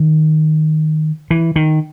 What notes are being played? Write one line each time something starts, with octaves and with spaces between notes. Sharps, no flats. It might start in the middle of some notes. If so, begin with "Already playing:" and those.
Already playing: D#3
E3
D#3